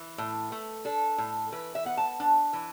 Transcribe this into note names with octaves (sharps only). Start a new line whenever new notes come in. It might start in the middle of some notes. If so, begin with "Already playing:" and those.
Already playing: E3
A2
A3
D4 A4
A2
E3 B4
E5
B3 F#5
A5
D4
E3